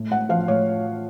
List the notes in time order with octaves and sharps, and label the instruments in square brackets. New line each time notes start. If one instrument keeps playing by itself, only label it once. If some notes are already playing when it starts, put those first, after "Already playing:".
Already playing: [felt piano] A2
A2 F#5
F3 F5
A2 C#5